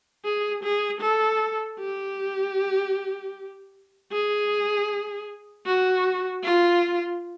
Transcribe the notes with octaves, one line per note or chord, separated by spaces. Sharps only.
G#4
G#4
A4
G4
G#4
F#4
F4